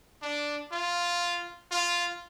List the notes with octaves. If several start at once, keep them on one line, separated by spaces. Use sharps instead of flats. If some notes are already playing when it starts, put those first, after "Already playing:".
D4
F4
F4